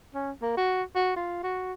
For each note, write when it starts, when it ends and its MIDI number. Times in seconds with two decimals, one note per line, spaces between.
0.15 0.31 61
0.42 0.54 58
0.57 0.83 66
0.95 1.15 66
1.16 1.42 65
1.43 1.73 66